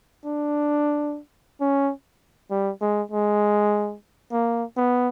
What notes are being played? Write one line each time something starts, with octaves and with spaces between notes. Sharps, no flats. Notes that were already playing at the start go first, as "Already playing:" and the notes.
D4
C#4
G3
G#3
G#3
A#3
B3